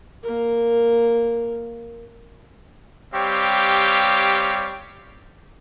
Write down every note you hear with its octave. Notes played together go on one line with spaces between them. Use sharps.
A#3 A#4
G3 C4 G4 C#5 F5